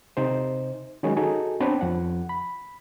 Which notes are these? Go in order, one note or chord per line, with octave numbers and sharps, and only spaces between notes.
C3 D#4 C5
D#3 F#3 G#3 C#4
D#4 F#4 G#4 A4
B3 C4 D4 B4 C#5
F2 F3 F#5
B5